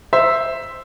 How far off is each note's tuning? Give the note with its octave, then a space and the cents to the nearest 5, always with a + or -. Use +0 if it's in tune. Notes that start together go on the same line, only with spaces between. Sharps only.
C5 +0 E5 +0